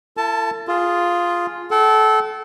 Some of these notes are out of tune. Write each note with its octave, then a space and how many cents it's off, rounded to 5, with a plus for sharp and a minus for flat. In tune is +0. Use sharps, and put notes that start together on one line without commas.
E4 +40 A4 +40 A5 +0
F4 +0 G#4 +0
A4 -20 F#5 +45